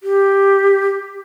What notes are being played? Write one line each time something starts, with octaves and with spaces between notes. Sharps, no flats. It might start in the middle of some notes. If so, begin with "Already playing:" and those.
G4